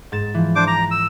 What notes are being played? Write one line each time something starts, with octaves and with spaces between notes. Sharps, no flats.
G#2 A6 E7
E3 F3
D4 C5 D6
A#5
E6